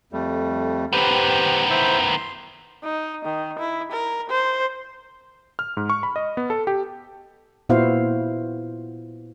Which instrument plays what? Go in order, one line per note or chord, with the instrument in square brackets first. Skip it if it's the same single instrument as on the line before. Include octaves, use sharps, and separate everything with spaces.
[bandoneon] F2 G3 A3
[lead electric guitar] D#3 B3 [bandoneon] G4 B4 C5
[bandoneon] E4 C5 E5
C6
[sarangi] D#4
D#3
E4
A#4
C5
[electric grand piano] F6
G#2
C#6
B5
D#5
B3
A4
G4
[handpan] A#2 B3 E4 F#4 C5 F5